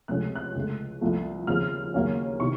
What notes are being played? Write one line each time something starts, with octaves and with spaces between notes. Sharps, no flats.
C#2 C3 F3 A3 C#4 F#6
F#6
C#2 C#3 A3
C2 A#2 F3 A3 C4
D#2 C#3 F3 C4 F6
D#2 C#3 F#3 A#3 C#4
C3 D#3 C#6